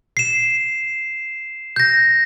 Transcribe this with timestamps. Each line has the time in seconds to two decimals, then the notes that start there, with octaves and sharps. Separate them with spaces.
0.17 C7 E7
1.76 G6 A#6